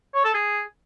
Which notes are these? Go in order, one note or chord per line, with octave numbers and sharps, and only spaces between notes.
C#5
A4
G#4